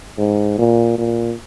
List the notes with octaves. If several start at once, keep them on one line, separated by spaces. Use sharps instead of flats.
G#2
A#2
A#2